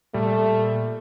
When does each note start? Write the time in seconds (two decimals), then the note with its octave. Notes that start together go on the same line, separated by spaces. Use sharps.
0.14 A#2 G3 A3